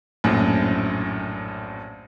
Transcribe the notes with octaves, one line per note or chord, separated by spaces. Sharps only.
A#1 F#2 A2